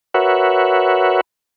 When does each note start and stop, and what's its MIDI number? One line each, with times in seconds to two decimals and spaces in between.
0.14 1.21 66
0.14 1.21 70
0.14 1.21 71
0.14 1.21 73
0.14 1.21 76
0.14 1.21 78